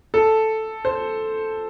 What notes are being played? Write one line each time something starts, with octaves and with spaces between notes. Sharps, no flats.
A4
C5